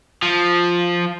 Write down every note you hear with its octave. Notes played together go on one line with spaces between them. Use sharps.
F3